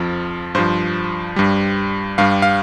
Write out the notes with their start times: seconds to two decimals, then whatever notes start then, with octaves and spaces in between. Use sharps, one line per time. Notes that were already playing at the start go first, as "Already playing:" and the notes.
Already playing: F2 F3
0.55 G2 F3 C5
1.36 G2 G3
2.18 G2 G3 F5
2.42 F5